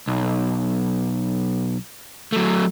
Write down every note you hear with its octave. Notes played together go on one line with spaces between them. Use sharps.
B1
F#3 A3